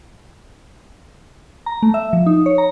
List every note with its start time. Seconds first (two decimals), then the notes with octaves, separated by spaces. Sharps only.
1.66 A#5
1.82 A3
1.94 E5
2.13 F3
2.26 D#4
2.46 C#5
2.58 A#5